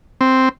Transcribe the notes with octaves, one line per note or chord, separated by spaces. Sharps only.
C4